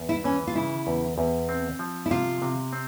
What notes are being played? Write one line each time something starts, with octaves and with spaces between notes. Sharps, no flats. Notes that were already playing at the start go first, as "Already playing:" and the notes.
Already playing: E2
E4
E3 C#4
F4
C#3 E4
E2
E2
C4
F3
E4
C3 F4
C3
C4